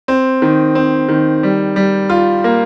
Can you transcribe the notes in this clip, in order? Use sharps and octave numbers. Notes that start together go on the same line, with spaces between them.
C4
D#3
C4
D#3
G3
G3
F4
A#3